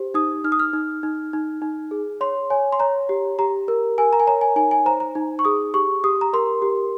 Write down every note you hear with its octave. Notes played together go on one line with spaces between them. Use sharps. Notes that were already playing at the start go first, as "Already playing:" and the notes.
Already playing: G4 C5
D#4 D#6
D#4 F6
D#6
F6
D#4
D#4
D#4
D#4
G#4
C#5 C6
C#5 G#5
C6
C#5 A#5
G4
G4 A#5
A#4
A#4 G#5
A#5
G#5
C#5 A#5
G#5
D#4 G#5
G#5
C5 A#5
A#5
D#4
C#6
G#4 D#6
G4 C#6
G4 D#6
A#5
A#4 C6
G4